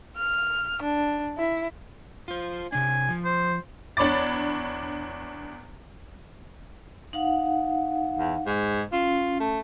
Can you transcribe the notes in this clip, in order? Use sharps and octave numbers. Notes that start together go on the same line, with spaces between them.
F6
D4
E4
F4 C5
C3 D4 G#5
F3
C5
E2 D4 C#5 B5 D6 A6
D#4 F5 F#5
E2
G#2
C#4 F4
A3